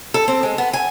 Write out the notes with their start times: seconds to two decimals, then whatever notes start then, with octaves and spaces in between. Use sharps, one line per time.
0.14 A4
0.28 C4
0.43 G#3
0.58 B3
0.73 G#5